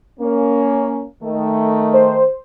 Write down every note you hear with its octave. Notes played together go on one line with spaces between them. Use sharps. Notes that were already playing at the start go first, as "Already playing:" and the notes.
A#3 C#4
D#3 A3
C5